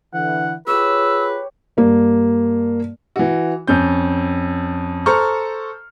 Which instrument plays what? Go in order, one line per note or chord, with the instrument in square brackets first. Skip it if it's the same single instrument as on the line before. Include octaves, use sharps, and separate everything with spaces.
[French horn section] D3 E3 [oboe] F#5
[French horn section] F4 G#4 [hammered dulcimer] G4 C#5 [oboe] B4 [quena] E6
[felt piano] G2 A#3
[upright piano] E3 F#4
F2 C#4 G6
A4 C5 A#5 C#6 F6